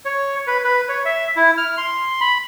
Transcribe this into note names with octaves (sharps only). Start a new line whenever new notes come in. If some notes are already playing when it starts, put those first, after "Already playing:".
C#5
B4
B4
C#5
E5
E4
F6
C6
B5